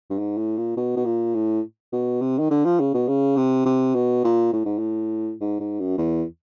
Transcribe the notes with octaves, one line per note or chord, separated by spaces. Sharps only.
G2
G#2
A2
A#2
B2
B2
A#2
A2
B2
C3
D#3
D3
F3
C#3
B2
C#3
C3
C3
B2
A#2
A2
G#2
A2
G#2
G#2
F#2
E2